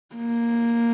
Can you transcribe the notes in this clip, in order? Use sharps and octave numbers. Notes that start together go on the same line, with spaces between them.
A#3